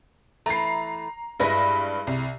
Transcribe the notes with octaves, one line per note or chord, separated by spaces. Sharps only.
E3 A3 A#5 C7
G2 G#3 E4 B4 A#6
C2